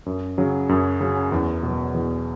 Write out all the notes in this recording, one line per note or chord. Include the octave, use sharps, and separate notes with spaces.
F#2
C#3 F#3
F#2
C#3 F#3
E2
B2 F#3
E2